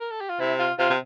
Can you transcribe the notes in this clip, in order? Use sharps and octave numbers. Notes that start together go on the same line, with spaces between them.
A#4
A4
G4
F4
C3 E4
F4
C3 F4
C3